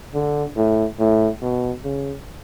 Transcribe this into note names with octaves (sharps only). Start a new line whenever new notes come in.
D3
A2
A2
B2
C#3